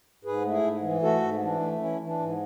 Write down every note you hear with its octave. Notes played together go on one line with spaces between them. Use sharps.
G#2 G#4 B4
A3
E4 G#4
G#2
E3
A3 F#4 A4
G#2
E3 D4
A3
E3 C#4 E4
E3
D4
G#2